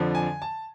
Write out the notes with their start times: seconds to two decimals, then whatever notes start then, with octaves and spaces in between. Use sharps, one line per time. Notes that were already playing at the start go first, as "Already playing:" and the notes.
Already playing: F2 D3 F3
0.15 G#5
0.42 A5